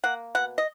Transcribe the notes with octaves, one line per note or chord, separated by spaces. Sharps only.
A#3 F#5
B2 F#5
D#5